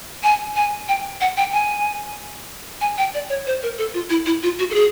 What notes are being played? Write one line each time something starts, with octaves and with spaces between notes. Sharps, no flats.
G#5
G#5
G5
F#5
G5
G#5
G#5
G5
D5
C#5
C5
A#4
A4
F4
E4
E4
F4
F#4
A4
G#4